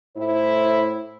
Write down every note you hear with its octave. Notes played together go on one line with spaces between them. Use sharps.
A2 E4 C5